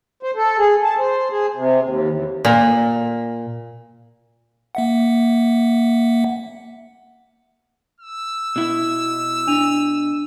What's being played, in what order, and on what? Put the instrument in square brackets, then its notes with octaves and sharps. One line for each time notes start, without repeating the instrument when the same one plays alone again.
[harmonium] C5
A4
G#4
A5
C5
G#4
C3
D#2
E2
[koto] A#2
[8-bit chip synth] A#3 E5 F#5
[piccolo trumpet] E6
[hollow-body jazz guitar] B2 E4
[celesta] D4 D#7 F7